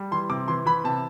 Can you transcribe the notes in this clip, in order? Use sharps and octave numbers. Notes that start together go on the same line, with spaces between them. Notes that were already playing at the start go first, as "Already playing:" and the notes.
Already playing: G3
E3 C6
C3 D6
E3 C6
E3 B5
C3 A5